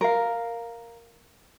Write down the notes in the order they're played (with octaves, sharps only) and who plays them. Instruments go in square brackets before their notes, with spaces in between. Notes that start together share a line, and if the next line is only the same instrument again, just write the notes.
[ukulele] A#4 F5